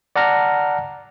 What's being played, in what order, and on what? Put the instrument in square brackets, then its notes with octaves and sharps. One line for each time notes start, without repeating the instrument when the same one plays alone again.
[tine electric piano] D5 F#5 A5 A#5 F6 A#6